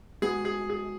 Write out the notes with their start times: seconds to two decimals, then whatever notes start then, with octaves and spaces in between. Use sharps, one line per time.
0.22 G#3 B3 F#4 G#4
0.45 G#4
0.70 G#4